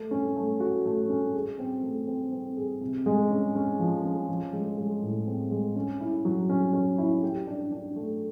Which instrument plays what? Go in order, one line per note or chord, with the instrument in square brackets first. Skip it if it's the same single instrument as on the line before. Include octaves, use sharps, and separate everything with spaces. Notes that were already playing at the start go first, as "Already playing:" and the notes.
Already playing: [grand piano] A3
C#4
A3
F#4
A3
C#4
G#4
C4
A3
C4
C4
G#4
C3
G#3
C#4
C#4
F3
C#4
F3
G#3
G#3
A2
C4
G#3
C#4
E4
F#3
C#4
C#4
E4
G4
D4
D4
A3